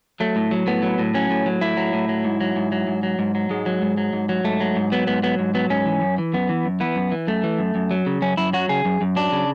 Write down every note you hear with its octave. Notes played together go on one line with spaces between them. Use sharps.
F#3 A3
A2
F#3
A2 B3
F#3
A2
F#3 C#4
A2
F#3
A2 E4
F#3
A2
F#3
G#2
F#3
G#2
F#3
G#2
F#3
G#2
F#3
G#2 G#3
F#3
G#2
F#3
G#2
F#3
G#2 A3
F#3
G#2
F#3 B3
G#2 B3
F#3 B3
G#2
F#3 B3
G#2 C#4
E3
F#2
E3
F#2 B3
E3
F#2
E3 B3
F#2
E3
F#2 A3
E3
F#2
F#2
F#3
C#3
F#2 C#4
F#2 E4
F#3 F#4
C#3 G#4
F#2
F#2
F#3 D4
C#3